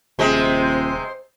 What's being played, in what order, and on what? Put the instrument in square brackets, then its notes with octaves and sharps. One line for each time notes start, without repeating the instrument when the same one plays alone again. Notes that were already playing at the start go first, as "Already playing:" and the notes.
[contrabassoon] D#1 [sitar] C3 G#3 [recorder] C5